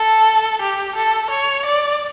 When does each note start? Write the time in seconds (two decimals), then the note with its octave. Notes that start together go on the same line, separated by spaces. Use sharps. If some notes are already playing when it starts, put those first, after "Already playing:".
Already playing: A4
0.61 G4
0.96 A4
1.30 C#5
1.65 D5